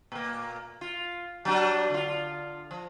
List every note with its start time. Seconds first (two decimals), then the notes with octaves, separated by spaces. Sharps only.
0.12 A#2 A#3
0.81 F4
1.45 F#3 G3 D4
1.90 D3 F4
2.71 F3